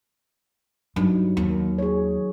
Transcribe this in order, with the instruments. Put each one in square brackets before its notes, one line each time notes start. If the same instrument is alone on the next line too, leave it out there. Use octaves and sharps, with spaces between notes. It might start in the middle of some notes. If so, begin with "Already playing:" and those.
[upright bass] G2 [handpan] F#3 D#4
[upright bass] D#2
[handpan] G#4 C#5